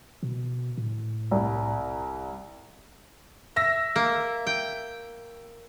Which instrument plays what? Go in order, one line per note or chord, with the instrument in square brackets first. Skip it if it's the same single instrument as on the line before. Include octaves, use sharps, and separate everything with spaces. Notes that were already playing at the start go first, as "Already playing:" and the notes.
[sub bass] B2
A2
[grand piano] C2
[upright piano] E5 E6 A#6
[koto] A#3
G5